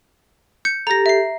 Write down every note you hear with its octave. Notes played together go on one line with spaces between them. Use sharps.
G6 C#7
G4 A4 A#5 A#6
E5 C7